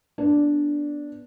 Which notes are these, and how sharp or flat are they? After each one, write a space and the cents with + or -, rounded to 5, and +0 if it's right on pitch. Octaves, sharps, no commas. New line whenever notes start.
B3 -10 D4 -5